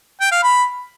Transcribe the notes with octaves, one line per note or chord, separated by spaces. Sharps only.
G5
F5
B5